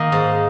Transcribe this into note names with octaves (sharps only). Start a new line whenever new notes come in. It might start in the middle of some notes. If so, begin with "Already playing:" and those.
Already playing: D#3 A#3 D#4 D#5
G#2